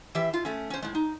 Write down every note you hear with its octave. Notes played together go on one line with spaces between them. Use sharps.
E3 G4 E5
F4
A3 C#4
C#4 C5
A2 G#3
D#4